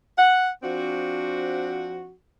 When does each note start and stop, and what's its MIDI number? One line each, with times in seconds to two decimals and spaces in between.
0.18 0.49 78
0.63 2.12 53
0.63 2.12 60
0.63 2.12 62
0.63 2.12 66